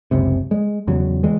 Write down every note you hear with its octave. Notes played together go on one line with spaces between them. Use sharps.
F#1 C#2 C3
G#3
E2 C#3 F#3
E3 G#3